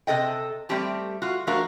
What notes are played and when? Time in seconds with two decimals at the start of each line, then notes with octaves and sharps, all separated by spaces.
0.07 C3 A4 D#5 G5
0.69 G3 A3 C4 G4 A5
1.22 F4 F#4
1.47 F3 A3 D4 F#4 A#4 F5